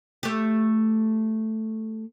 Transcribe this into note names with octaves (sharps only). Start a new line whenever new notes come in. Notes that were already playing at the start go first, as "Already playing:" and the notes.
A3 G4